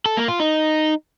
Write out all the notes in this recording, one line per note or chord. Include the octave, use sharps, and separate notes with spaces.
A4
A#3
F4
D#4